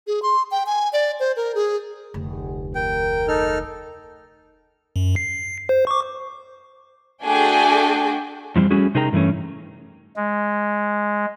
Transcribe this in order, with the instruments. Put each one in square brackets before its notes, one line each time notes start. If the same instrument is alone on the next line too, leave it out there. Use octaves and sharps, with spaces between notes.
[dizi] G#4
C6
G5
G#5
D5
C5
A#4
G#4
[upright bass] F1 D2
[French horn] A#4 [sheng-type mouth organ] G5
[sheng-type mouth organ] D#4 A4 F6
[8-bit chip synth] F#2
C7
C5
C#6 D6
[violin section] A3 D4 F#4 G#4 G5 G#5
[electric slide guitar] F2 E3 G3 C4
G3 A3 C#4 F#4 G#4
C3 D#4 G#4 A#4 G5 A#5
G2 E3 A3 C#4
[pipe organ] G#3